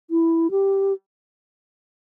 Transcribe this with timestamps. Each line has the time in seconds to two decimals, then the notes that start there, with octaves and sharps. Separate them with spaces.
0.10 E4
0.51 G4